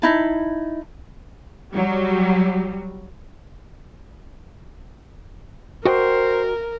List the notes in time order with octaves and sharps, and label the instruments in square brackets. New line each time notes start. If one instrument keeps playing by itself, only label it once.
[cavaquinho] D#4 E4 A5
[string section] F#3 G3
[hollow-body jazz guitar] F#4 D#5 G5 [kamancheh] A#4 [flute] C5